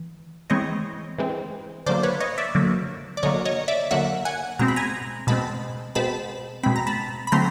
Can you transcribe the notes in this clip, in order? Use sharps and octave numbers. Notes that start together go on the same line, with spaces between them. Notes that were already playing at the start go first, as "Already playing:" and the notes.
Already playing: E3
E3 G#3 C4 C#5 D#5
E3 G#3 C4
D3 F#3 A#3 C5 D5
B4 C#5
C#5 D#5
D5 E5
D3 F#3 A#3
D5
D3 F#3 A#3 C#5 D#5
C#5 D#5
D5 E5
D3 F#3 A#3 E5 F#5
F#5 G#5
B2 G#3 C4 A#5
B5
G#5 A#5
B2 G#3 C4 A5 B5
B2 G#3 C4 A5 B5
B2 G#3 C4 B5
A#5
A5 B5
B5
D3 F#3 A3 C4 A#5 C6